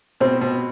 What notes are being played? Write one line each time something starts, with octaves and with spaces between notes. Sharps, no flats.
B2 C4
B2